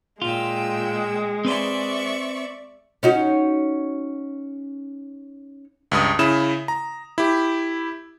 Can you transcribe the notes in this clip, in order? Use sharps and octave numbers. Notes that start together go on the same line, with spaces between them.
A#2 G#3 F4 G5 E6
C4 B4 C5 D5 E5 C#6
C#4 D#4 F#4
C#2 G2 D#6
C#3 E4 E7
A#5
E4 G4